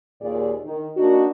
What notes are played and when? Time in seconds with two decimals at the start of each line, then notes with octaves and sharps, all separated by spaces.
0.21 D#2 A#2 G#4 D5
0.65 D#3
0.97 A#3 D4 D#4 F#4